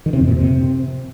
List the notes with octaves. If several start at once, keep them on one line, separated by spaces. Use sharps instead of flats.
D#3
C3
F2
A#2
C3